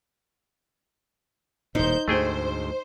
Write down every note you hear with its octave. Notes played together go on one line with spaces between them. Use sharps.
D#1 A2 D#4 C5 G6
D2 G#2 A3 G#4 C5 G5